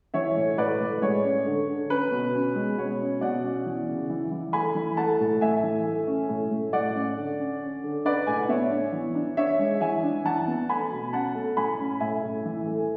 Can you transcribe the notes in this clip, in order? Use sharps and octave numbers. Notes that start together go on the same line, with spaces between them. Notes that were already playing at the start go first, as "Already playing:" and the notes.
E3 C#5 E5
A2
A2 B4 D5
A2
G#3 C#5
C#4
D3
D3
C#4 B4
B2
C#4
G#3
B2 C#5
C#4
B2 D5 F#5
C#4
E3
C#3
E3
E3
A3 G#5 B5
E3
A3 F#5 A5
A2
A3 E5 G#5
E3
A3
C#4
A2
A2
A2 D5 F#5
C#4
D3
C#4
C#4
D3
D4 B4 D5
A2 G#5
F#5
B3 C#5 E5
D4
E3
D4
D4 C#5 E5
G#3
E3 E5 G#5
D4
E3 F#5 A5
B3
A3 G#5 B5
B2
C#4 F#5 A5
A3
A2 G#5 B5
C#4
A2 E5 G#5
A2
E3
A3